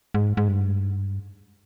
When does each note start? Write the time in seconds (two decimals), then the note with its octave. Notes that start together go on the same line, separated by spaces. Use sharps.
0.14 G#2
0.37 G#2
0.48 G2